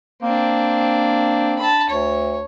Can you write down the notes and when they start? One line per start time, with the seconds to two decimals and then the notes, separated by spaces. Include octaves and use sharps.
0.22 A#3 C4 D4
1.59 A5 B5
1.90 D2 C#5